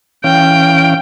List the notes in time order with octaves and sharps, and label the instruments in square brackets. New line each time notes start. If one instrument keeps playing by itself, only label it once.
[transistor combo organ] E3 C#4 F5 [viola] G5